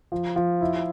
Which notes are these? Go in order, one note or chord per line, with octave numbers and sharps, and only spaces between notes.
F3
F3
E4